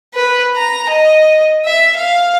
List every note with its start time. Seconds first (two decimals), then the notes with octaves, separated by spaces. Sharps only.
0.14 B4
0.56 A#5
0.90 D#5
1.65 E5
1.97 F5